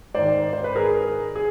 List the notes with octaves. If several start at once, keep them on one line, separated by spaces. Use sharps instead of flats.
G#2 D#3 C5 D5
C5
B4
G#4 A#4
G#4